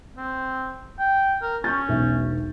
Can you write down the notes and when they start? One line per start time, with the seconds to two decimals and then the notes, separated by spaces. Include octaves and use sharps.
0.17 C4
0.99 G5
1.42 A#4
1.64 C#4 C#6 G6 A6
1.88 E1 B1 E5